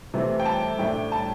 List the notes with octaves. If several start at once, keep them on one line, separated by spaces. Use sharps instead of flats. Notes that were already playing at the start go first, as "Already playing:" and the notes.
C3 E3 A3 C4
G5
A5
A2 A3 D4 G5
A5